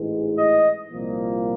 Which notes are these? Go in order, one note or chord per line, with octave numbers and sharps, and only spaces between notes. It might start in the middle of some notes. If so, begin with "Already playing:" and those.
Already playing: A1 G#2 E3 G#3
D#5
C2 A#2 F3 A#3